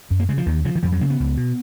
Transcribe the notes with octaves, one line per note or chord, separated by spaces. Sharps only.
F#2
A#3
C#3 G#3
F3
D#2 D#3
C#3 F3
D#3
F2 F3
F#3
C#3 A#3
B3
C#2
B2